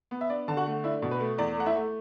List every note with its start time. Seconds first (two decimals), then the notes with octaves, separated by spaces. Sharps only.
0.11 B3
0.21 E5
0.30 D4 D5
0.48 D3 A5
0.57 F#4 F#5
0.66 A3
0.84 D4 E4 E5
1.02 B2
1.11 B4
1.20 A3
1.38 E2 D5
1.56 A3 F#5
1.66 E4 E5
1.76 A3